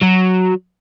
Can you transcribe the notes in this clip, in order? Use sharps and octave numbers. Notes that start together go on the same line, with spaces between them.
F#3